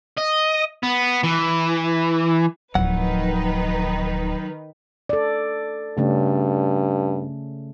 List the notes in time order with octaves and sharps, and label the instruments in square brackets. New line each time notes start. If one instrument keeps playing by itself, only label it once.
[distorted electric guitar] D#5
B3
E3
[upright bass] D1 F3 [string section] D#3 D#4 B4 [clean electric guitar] F#3 F#5
[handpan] A4 D5
[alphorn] G2 [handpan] C#3 A3 C#4